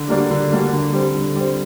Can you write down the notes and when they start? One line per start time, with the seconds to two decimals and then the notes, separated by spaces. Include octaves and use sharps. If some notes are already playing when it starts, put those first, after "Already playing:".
Already playing: D3
0.08 G3 A#3 D4 F#4
0.31 D3
0.52 G3 A#3 D4 F#4
0.73 D3
0.93 G3 C4
1.15 D3
1.36 G3 C4